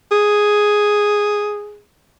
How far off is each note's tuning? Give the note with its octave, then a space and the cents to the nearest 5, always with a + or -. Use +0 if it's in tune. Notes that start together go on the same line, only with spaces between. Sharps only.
G#4 +0